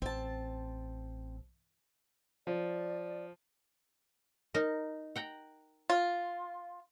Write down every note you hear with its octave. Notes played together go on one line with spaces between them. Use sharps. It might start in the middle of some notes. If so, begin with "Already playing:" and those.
A1 C4 A5
F3 D5
D#4 A#4
F#5 G5 A#5
F4